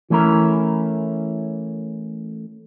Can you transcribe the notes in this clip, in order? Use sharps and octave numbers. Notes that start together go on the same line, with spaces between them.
E3 A3 C#4 E4 A#4